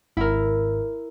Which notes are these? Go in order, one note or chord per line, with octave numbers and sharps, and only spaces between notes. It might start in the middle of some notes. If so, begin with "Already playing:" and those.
G#1 E4 A#4